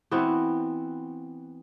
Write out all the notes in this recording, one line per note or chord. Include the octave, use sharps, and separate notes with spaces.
E3 B3 C4 F#4